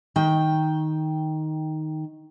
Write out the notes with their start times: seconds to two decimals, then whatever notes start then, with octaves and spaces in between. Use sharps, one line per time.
0.16 D#3 G5